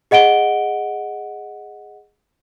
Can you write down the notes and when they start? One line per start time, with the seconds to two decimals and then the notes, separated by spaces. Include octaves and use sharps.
0.11 G#4 D#5 F#5 D7 G7